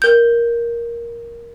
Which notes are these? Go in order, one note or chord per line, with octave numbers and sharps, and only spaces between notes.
A#4 G6